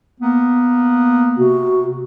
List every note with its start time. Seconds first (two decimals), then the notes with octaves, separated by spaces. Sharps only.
0.20 A#3 B3
1.38 C3 F#4